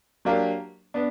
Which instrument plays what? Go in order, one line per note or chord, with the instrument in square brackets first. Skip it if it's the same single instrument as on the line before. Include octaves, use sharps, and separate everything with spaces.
[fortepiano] F#3 A#3 D4 G4
B3 D4